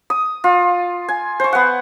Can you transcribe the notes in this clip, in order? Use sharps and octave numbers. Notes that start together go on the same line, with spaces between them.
D#6
F4
G#5
C5 C#6
B3 F#5